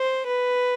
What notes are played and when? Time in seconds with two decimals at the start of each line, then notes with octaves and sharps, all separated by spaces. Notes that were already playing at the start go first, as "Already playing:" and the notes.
Already playing: C5
0.26 B4